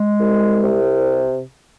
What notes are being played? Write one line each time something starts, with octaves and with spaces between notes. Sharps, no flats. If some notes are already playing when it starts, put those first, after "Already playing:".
Already playing: G#3
C2
C3